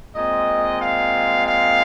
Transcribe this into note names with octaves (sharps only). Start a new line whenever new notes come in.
A#2 G#3 C4 D#5
F5
F5